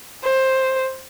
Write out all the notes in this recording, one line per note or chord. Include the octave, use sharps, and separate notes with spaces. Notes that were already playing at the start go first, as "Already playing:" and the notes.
C5